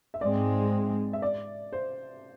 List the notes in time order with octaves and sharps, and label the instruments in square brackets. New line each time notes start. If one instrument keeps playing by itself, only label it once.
[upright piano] E5
[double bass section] G#2 G#3 C4 [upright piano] D5
[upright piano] E5
D5
C5